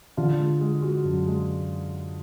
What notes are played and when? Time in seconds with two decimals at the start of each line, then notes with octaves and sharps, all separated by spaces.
0.17 D3 F4
0.38 G#3
0.61 G#3
0.82 G#3 F#4
1.04 F#2
1.27 G#3